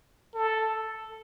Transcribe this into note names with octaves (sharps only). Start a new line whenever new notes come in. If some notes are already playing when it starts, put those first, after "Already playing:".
A4